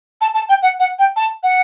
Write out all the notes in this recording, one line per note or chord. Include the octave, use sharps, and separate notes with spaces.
A5
A5
G5
F#5
F#5
G5
A5
F#5